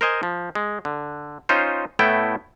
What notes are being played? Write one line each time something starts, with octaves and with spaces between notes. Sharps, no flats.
A#4 C5 D#5 G#5
F3
G#3
D3
C#4 D#4 F4 C5
A2 A3 B3 E4 G5